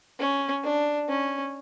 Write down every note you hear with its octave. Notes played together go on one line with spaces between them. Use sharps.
C#4
D4
C#4